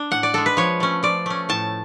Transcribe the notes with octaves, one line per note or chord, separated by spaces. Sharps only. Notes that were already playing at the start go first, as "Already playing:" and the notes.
Already playing: D4
A2 F#5
D5
G#3 D4 A4
B4
F3 C#5
A3 C#4
F3 D5
A3 C#4
A2 A5